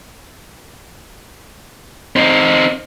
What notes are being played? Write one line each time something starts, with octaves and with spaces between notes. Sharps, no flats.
C4 D#4